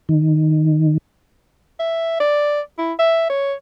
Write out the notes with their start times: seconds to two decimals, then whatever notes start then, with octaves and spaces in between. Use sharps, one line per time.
0.09 D#3
1.79 E5
2.20 D5
2.78 E4
2.99 E5
3.29 C#5